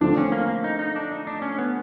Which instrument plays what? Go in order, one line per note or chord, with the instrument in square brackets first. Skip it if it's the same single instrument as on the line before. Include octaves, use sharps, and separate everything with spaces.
[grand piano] D3 F3 A3 C4 [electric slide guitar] D4
[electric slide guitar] C#4
A#3
A#3
D#4
D#4
D4
D#4
D4
C#4
B3